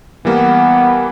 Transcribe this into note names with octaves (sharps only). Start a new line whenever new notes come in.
E3 G3 A#3 B3